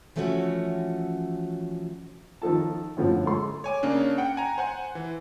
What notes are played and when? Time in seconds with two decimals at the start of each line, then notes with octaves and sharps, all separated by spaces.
0.16 E3 F3 A3 C#4 F#4
2.42 D#3 F3 A4 A5
2.97 F#2 A2 D3 F3
3.25 G#3 A4 C6
3.64 C#5 G#5 D6
3.83 C#3 A#3 C#4 D4
4.18 F#5 G5
4.37 G#5 A#5
4.58 C5 F#5 G#5
4.95 E3